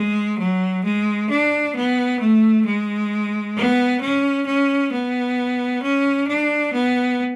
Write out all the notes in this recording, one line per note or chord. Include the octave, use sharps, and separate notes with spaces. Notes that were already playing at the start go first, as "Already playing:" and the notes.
Already playing: G#3
F#3
G#3
D4
B3
A3
G#3
B3
C#4
C#4
B3
C#4
D4
B3